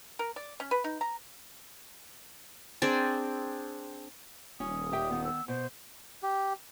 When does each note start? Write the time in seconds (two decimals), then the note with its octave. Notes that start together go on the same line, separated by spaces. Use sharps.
0.19 A#4
0.36 D5
0.60 C#4
0.71 B4
0.84 D#4
1.01 A#5
2.82 C4 D4 G#4 D5
4.60 D#1 C#4 D#6
4.92 G4 E5 G5
5.10 D#3 B3
5.24 E6
5.48 B2 C5
6.23 G4